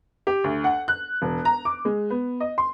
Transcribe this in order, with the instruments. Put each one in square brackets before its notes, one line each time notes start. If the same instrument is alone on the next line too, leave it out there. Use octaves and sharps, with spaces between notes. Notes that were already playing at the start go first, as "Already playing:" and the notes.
[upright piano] G4
D2
F#5
F#6
E1
A#5
D6
G#3
B3
D#5
C6